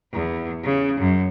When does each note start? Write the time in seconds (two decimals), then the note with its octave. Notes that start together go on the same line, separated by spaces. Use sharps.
0.12 E2
0.64 C#3
1.00 F#2